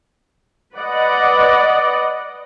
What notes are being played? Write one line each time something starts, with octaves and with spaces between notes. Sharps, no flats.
B4 D5 D#5 F#5